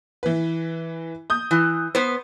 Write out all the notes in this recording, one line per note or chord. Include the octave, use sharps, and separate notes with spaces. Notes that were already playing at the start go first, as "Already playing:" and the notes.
E3 B4
D#6 G6
E3
B3 C5